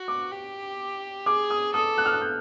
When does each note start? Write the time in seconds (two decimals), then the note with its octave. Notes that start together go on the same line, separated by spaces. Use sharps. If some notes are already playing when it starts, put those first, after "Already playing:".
Already playing: F#4
0.08 D6
0.32 G4
1.26 G#4 D6
1.50 D#6
1.74 A4 D#6
1.98 F#6
2.05 F6
2.13 F#6
2.21 G6